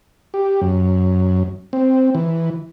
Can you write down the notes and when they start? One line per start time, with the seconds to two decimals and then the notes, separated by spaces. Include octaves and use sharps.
0.34 G4
0.61 F#2
1.73 C4
2.15 E3